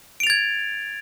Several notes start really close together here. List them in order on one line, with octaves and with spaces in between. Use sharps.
D7 F7 A6 G#6